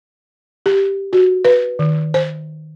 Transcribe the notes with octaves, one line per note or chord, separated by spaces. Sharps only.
G4
F#4
B4
D#3
C5